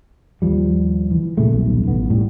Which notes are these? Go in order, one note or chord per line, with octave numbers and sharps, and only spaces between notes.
D#2 F3 G3
E3
A#2 C#3 G#3 A3
D#1 B1
A1 B3
A2 G3